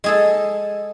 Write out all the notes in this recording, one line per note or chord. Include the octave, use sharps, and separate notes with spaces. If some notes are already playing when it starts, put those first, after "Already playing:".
G#3 G#4 A4